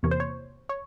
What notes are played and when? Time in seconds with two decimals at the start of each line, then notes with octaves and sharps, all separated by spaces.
0.03 E2 C3 E3 A#3 C#5
0.11 C5
0.20 C#5
0.69 C#5